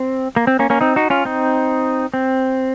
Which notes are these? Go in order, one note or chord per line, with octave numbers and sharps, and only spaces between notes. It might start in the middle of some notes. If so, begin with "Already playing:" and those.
Already playing: C4
A#3
C4
A#3 C#4
A#3 C#4
C4 D#4
D#4 F#4
C#4 F4
C4 D#4
C4